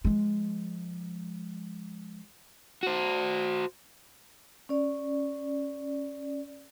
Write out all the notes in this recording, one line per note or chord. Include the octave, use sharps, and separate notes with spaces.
F3 G#3
F#4 C5
C#4 D5